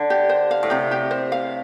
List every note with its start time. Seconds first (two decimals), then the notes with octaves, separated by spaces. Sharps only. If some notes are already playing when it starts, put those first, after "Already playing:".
Already playing: D3
0.10 G4
0.29 C5
0.51 F5
0.63 A2
0.70 C3 G4
0.91 G4
1.11 C5
1.32 F5